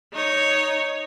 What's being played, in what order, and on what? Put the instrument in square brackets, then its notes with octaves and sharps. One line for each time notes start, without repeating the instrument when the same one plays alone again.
[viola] D#4 C#5